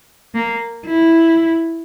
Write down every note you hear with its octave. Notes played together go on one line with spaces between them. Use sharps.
A#3
E4